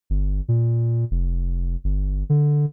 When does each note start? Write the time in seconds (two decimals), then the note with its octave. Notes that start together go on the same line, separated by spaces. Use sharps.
0.10 G1
0.48 A#2
1.11 F1
1.84 G1
2.30 D3